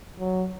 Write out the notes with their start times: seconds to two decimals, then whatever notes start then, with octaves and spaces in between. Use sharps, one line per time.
0.19 F#3